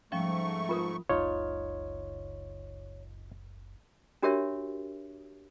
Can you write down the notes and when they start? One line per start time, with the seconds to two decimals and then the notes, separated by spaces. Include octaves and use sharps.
0.12 G#2 F3 G3 A3 C#4 C#6
0.69 F4 A#4 D#6
1.09 F#1 C#2 D#4 F4 C#5
4.22 D4 F#4 G4 A#4 C#5 E5